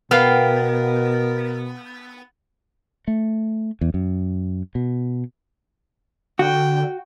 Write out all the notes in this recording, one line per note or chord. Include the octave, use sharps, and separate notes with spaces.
B2 B3 A#4 F5 G5 F6
A3
E2
F#2
B2
D3 F#4 G5